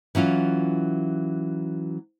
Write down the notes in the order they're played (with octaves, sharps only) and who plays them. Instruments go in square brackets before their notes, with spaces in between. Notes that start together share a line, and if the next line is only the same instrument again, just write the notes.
[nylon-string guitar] E3 F#3 C#4 F4